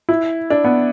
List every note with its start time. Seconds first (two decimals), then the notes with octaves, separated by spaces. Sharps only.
0.09 E4
0.50 D4
0.64 B3